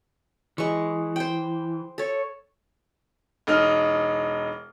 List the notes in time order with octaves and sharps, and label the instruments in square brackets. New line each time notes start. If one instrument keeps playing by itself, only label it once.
[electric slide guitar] E3 [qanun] G#3 C#6
[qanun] C5 G5
A4 C#5
[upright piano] E1 D#4 F6